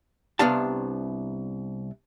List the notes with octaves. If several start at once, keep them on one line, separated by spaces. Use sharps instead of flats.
C2 C3 B3 D4 F5 A5